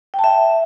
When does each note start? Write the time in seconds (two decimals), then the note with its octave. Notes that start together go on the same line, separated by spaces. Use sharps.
0.14 G5
0.19 A5
0.24 E5